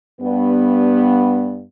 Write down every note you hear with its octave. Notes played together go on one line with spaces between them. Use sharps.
G2 B3